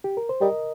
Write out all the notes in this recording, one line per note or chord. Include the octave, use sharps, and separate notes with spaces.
G4
A#4
C5
G3 A#4 D#5